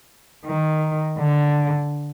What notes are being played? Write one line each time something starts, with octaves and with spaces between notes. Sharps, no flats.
D#3
D3